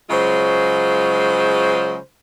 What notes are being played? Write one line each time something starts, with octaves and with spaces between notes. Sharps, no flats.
C#3 F#3 G#3 F4 C5